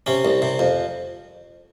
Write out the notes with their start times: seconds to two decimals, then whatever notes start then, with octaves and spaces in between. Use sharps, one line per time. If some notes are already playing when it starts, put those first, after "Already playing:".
0.06 C3 C#4
0.25 C2
0.42 C3
0.59 F2